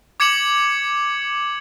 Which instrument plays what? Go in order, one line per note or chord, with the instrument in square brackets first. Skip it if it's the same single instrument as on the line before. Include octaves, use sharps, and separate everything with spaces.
[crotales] D6 G#6 C#7 E7 F#7